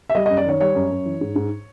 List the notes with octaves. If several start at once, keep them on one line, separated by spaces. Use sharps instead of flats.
E5
G3 D#5
F#2 D#5
D5
D#3 C#5
G3 C#5
F#2
F#2
E3
G#2
G#2